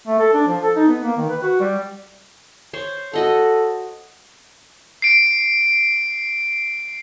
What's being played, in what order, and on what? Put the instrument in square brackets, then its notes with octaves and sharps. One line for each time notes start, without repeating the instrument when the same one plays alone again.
[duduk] A3
A4
D4
F3
A4
D#4
B3
A#3
D#3
B4
F#4
G3
[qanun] C5 C#5
[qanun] F#4 D#5 F#5 [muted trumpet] A4
[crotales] C7 D7